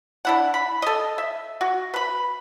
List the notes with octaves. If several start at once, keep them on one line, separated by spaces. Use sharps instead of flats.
D4 E4 F#5
B5
A4 D#5
E5
F#4
B4 B5